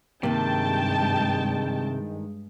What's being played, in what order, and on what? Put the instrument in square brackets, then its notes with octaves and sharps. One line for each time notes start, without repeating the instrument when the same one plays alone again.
[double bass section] G2 G#3 [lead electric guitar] C3 [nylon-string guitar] D#3 A#3 [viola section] G5 A5